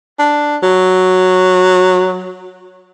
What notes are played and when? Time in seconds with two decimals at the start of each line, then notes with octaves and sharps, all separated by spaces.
0.19 D4
0.62 F#3